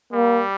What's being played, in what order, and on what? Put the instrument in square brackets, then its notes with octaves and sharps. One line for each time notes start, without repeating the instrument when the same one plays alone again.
[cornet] G3 [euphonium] A#3